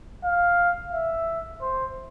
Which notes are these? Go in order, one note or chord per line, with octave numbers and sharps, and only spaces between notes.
F5
E5
C5